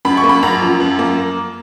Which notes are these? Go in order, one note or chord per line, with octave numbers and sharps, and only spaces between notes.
F#2 B5
C#6
A#3
B5
F#2 A#5
F3
F#2
A#3